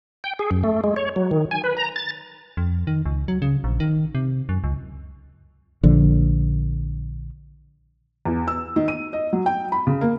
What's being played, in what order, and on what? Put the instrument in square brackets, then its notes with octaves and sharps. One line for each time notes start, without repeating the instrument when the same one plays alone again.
[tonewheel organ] G5
G#4
F#2
A3
G#3
C#5
F#3
D#3
G#5
B4
A#5
A6
[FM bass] F2
D#3
C#2
F#3
C#3
A#1
D#3
C3
F#2
C#2
[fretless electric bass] A#1 D3 F3
[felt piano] E2
E6
D#3
D#7
D#5
F#3
G5
B5
C#3
A#3